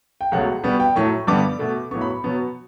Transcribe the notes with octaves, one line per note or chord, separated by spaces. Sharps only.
G5
C#2 B2 F#3 A3 F#5
B2 G3 B3
G5
A2 F#3 A3 C#6
G2 D3 G3 B3 D6
B2 A3
A2 F#3 B3 C#6
B5
C#6
B2 F#3 B3